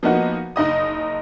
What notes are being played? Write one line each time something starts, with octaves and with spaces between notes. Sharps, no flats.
F3 A#3 B3 D#4 F#4
F#1 D#4 D#5 D#6